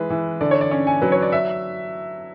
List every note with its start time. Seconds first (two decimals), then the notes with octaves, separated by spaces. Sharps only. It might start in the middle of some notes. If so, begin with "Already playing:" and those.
Already playing: E3 G#3 B4
0.10 E3
0.41 D3 D5
0.51 C#5
0.61 D5
0.71 C#4
0.87 G#5
1.02 F#3 B4
1.12 C#5
1.22 D5
1.32 E5